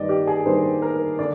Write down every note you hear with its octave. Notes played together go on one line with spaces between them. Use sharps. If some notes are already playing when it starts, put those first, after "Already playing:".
Already playing: G2 D#3 A#3 D4 D5 D#5
G4
G#4
G2 D#3 A#3 D4 C5
A#4
D3 D5